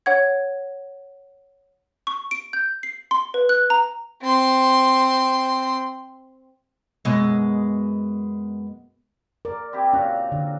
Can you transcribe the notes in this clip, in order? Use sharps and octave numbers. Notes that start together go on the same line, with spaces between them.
C#5 F#5 G#6
C#6
D7
G6
C7
C6
B4
F#6
A#5
C4 C6
F#2 B2 G#3
A#4 D5
C4 E4 G4
A#2 C#4 F#4 F5
D3